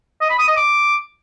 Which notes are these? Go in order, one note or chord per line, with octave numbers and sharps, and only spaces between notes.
D#5
B5
D#6
D#5
D6